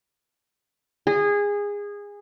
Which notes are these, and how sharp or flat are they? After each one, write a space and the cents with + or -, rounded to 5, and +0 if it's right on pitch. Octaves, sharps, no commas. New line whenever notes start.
G#4 -20